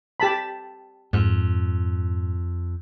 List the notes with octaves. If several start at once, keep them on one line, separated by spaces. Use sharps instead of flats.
G4 A5 B5
F2 G#2